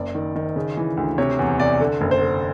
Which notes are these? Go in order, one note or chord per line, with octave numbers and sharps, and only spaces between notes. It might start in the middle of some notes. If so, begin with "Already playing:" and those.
Already playing: F#1 D5
D#3
D#3
C#3
E3
D2
C3 C#5
E2
C3 D5
D3
F#1
C5
D3